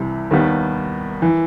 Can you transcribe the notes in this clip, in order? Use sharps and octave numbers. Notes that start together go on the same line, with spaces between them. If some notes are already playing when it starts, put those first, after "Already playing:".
Already playing: C2 C3 E3 G3
D#2 D#3 G3 B3
E3